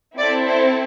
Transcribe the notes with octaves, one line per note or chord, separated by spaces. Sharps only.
C4 E4 A4 D5
C5